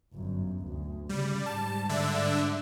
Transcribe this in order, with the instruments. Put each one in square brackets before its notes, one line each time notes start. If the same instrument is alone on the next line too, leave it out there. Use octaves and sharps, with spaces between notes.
[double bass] G1 F#2
D2
[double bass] C#3 [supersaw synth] G3
[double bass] G#2 G3 [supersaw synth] A5
[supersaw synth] D3 D4 E5